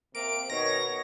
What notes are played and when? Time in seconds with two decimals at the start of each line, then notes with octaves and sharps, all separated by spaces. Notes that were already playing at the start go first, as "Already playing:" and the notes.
0.15 C3 A#3 D7
0.50 B2 D#3 C#5 A#6